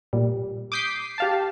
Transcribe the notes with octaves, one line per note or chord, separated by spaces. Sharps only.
A#2 G3
D6 D#6 G6 B6 C7
G4 F5 A5